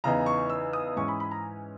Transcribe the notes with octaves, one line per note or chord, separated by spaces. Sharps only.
E2 C#3 E3 B3 D#4 A#5
C#6
E6
D#6
G#2 E3 G#3 C#4 C#6
B5
B5
A#5